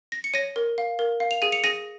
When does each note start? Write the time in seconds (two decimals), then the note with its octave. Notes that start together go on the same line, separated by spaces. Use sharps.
0.12 A#6
0.24 C#7
0.34 C#5 A#6 D#7
0.56 A#4
0.78 F5
0.99 A#4
1.20 F5
1.31 F7
1.42 G#4 D#7
1.52 C#7 F7
1.64 G#4 A#6 D#7